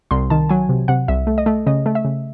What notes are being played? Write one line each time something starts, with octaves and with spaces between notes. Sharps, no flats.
C2 C6
D#3 A5
F#3 G#5
C3
C3 F#5
C2 E5
A3
D#5
A3
C#3 D#5
A3
E5
C#3